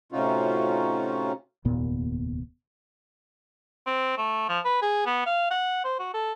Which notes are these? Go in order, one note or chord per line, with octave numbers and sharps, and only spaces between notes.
A2 C3 C#4 D#4 F4 F#4
F1 D#2 A#2 B3
C4
A3
F3
B4
G#4
B3
F5
F#5
C5
F#4
A4